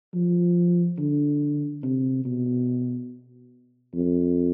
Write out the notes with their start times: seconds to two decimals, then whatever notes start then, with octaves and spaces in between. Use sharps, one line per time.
0.15 F3
0.98 D3
1.83 C3
2.25 B2
3.94 F2